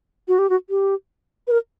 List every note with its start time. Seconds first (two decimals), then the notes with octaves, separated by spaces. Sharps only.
0.28 F#4
0.39 G4
0.50 F#4
0.70 G4
1.47 B4
1.51 A#4